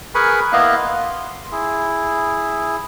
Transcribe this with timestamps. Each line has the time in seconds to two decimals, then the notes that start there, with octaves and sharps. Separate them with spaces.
0.15 G#4 A#4 B4 G#5 B5 C#6
0.53 A#3 B3 E4 D#5 F5 F#6
0.77 C6
1.51 E4 G#4